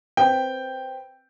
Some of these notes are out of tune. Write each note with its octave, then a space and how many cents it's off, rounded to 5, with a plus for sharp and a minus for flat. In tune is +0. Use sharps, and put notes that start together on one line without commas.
C4 +0 B4 +0 G5 +0